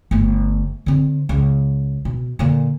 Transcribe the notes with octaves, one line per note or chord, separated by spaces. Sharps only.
G1 A3
D3 C4
C#2
B2
A#2 D3